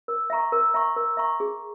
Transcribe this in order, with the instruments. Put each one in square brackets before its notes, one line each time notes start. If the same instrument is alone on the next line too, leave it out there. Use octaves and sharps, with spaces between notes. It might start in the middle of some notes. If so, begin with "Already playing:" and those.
[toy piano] A#4
E5 A#5 C#6
A#4
E5 A#5 C#6
A#4
E5 A#5 C#6
G#4